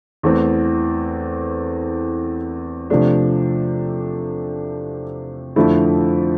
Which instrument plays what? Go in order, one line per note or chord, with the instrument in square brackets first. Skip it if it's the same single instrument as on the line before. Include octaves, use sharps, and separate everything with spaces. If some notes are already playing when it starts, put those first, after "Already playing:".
[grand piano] E2 E3 A3 C4
C3 F3 A3 D4
F2 D3 F3 A3 E4